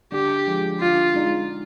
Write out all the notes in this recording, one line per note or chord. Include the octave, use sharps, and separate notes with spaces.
D3 G4
F3 G#3
D3 F4
G#3 D#4